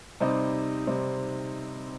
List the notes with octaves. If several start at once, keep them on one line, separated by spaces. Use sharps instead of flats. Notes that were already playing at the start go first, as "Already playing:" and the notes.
C3 G3 C4 D#4
C3 G3 C4 D#4